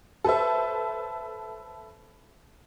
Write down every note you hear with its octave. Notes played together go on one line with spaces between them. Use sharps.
A4 B4 C5 E5